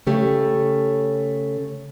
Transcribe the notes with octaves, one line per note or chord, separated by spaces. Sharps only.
C#3 A3 G4 C#5